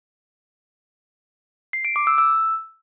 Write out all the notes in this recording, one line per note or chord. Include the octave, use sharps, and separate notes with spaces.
C7
D7
D6
E6
E6